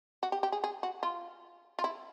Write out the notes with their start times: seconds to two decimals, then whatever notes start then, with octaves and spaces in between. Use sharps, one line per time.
0.23 F#4
0.32 G4
0.43 G4
0.52 G#4
0.64 G#4
0.83 F#4
1.03 F4
1.79 F4
1.84 E4